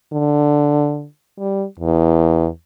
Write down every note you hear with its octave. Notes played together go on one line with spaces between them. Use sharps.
D3
G3
E2